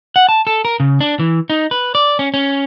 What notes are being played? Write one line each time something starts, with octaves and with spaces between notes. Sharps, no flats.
F#5
A5
A4
A#4
C#3
D4
E3
D#4
B4
D5
C#4
C#4